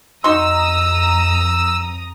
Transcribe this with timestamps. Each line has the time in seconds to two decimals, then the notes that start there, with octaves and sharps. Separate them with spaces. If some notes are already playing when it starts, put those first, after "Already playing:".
0.24 F2 D#4 F#4 A#5 C6 D#6 E6